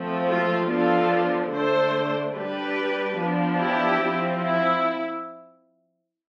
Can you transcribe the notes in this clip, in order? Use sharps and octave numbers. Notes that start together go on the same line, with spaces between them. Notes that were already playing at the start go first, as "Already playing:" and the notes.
Already playing: F3 A3 C4
F4 A4
F3 B3 D4 F4 A4
D3 A3 D4 A4 C5
G3 D4 G4 B4
F3 B3 D4
E4 G4
F3 C4
E4